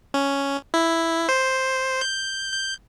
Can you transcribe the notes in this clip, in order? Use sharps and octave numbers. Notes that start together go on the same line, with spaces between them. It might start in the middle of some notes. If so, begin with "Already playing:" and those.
C#4
E4
C5
G6
G6